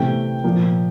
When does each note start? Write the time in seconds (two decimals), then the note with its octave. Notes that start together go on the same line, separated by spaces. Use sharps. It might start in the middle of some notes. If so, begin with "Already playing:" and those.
Already playing: C3 E3 A3 C4 G5
0.44 A#2 F3 A#3